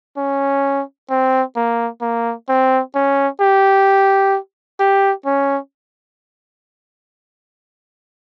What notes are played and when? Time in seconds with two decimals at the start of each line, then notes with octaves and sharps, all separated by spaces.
0.17 C#4
1.10 C4
1.56 A#3
2.02 A#3
2.49 C4
2.95 C#4
3.41 G4
4.80 G4
5.26 C#4